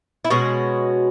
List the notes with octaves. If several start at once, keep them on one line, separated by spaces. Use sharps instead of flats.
E4
B2 G#3 C#4 F#4